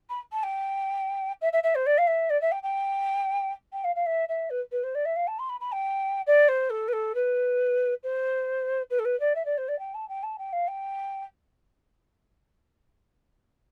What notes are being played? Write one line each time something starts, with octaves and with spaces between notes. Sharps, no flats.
B5
A5
G5
E5
E5
E5
C5
D5
F5
E5
D5
E5
G5
G5
G5
F5
F5
E5
E5
B4
B4
C5
D5
E5
F5
A5
C6
B5
B5
G5
D5
C5
A4
B4
A4
B4
C5
B4
A4
B4
D5
E5
D5
C5
D5
G5
A5
G5
A5
G5
F5
G5